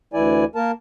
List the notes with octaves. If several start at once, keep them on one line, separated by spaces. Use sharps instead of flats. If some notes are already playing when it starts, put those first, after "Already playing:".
D2 E3 E4 D5 G#5
A#3 A#4 A5